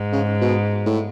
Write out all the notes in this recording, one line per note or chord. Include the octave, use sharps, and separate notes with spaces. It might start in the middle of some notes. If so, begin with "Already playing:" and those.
Already playing: G#2
C#3
B2
A2